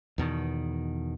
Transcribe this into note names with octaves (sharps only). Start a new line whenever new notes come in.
E2 B2 D#3